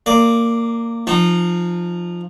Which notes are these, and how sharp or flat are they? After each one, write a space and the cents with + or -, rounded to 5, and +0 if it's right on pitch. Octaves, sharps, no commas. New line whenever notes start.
A#3 -15 D5 +0
F3 +0 D#4 -30